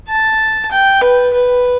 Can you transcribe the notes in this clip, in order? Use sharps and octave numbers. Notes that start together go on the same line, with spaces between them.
A5
G5
B4
B4